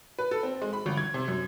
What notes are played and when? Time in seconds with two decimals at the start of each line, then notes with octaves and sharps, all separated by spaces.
0.19 B4
0.31 A4
0.43 C4
0.62 G#3
0.73 B5
0.86 G1
0.97 G#6
1.14 C3
1.28 F#2